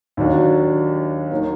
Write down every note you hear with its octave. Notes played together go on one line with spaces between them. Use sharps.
D#2 D#3 F#3 D4 F#4
D#3 F#3 A#3